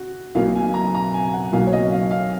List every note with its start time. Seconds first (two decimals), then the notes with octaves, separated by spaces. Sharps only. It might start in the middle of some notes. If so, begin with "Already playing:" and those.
Already playing: F#4
0.35 B1 B2 F#3 A#3 F5
0.55 G#5
0.74 A#5
0.95 A#5
1.14 G#5
1.34 F#5
1.52 B1 B2 A#3 F5
1.67 C#5
1.73 D#5
1.92 F5
2.11 F5